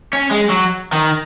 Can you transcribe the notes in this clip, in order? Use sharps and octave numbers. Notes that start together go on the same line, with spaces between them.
C#4
G#3
F#3
D#3